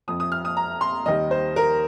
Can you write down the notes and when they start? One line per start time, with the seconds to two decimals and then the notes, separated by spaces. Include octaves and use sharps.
0.08 F2 F3 D#6
0.20 D#6
0.32 F6
0.45 D#6
0.57 A#5
0.81 C6
1.06 D#2 D#3 G3 D#5
1.31 C5
1.56 A#4